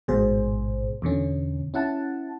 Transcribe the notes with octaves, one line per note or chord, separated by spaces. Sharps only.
A1 G#2 B2 G#4 C5
E2 B2 D3 C#4
C#4 E4 F#5 A5